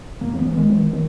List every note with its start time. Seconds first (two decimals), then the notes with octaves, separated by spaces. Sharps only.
0.21 F#2 A#3
0.34 E3
0.39 B3
0.45 E3
0.57 D#3 G#3
0.70 E3
0.81 D#3
0.93 D#3